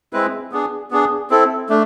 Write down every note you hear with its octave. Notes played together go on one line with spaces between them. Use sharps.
G#3 C4 E4 B4
B3 D4 G#4
B3 D4 G#4
C4 E4 A4
A3 D4